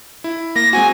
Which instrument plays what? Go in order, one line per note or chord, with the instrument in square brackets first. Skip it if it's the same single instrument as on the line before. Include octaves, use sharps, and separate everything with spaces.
[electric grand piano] E4
[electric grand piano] A#3 [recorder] A#6
[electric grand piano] G#3 C4 F#4 [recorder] G#5